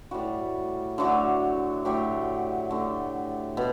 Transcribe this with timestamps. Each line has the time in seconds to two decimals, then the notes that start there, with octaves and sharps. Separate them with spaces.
0.11 A2 G3 F#4
0.98 D3 F#3 A3
1.85 A2 F#3 A3 G4
2.71 D3 A3
3.57 B2